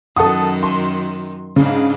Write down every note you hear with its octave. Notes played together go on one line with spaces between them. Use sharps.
F#2 D#3 A4 F#5 D#6
C6
G#2 C#3 D4